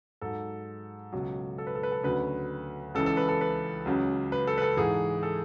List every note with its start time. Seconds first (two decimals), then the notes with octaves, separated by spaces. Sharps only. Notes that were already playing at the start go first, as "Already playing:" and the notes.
0.21 G#2 F#3 A4
1.12 C#2 B2 F#3
1.58 A4
1.67 B4
1.75 A4
1.83 B4
1.92 A4
2.04 D2 C#3 F#3 B4
2.94 C#2 C#3 E3 A4
3.06 A4
3.17 B4
3.29 A4
3.41 B4
3.85 C#2 C#3 F#3
4.32 B4
4.47 A4
4.58 B4
4.62 A4
4.77 G#2 E3 G#4
5.23 A4